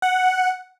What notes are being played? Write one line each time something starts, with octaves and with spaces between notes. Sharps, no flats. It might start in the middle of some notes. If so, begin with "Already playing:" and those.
F#5